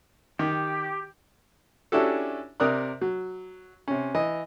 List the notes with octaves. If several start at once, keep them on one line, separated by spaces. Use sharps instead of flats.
D#3 G4
C#4 D4 E4 F#4 G4 A4
C3 A#4 D5 D#6 F#6
F#3
C3 C#4
E3 D#5